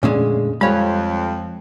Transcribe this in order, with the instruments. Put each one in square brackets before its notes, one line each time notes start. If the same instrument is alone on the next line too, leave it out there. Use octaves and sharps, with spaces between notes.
[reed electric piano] F2 A3 C#4 [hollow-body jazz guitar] A#2 D3 G#3
[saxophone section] F2 [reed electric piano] G3 F5 [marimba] G#3 [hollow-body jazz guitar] C#5 B5